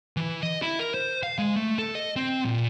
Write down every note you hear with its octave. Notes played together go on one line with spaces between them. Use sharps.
E3
D#5
E4
A#4
C5
F5
G#3
A3
A4
D#5
C4
A#2